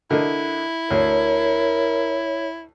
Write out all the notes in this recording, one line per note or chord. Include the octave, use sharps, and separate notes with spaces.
D3 E4 A#4 D#5
D2 A#4 C#5